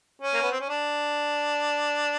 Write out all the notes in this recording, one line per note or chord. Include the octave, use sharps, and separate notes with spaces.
C#4
A#3
B3
C4
C#4
D4